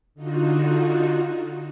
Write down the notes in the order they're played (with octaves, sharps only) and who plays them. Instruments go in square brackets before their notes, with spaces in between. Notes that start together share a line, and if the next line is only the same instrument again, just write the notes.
[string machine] D3 D#4 F4 F#4